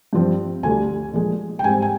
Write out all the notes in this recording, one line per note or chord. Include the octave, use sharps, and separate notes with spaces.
G2 F3 C4
D2 D3 G3 G#5
A#2 F3 G#3
G5
G#2 G3 C4 G#5
G#5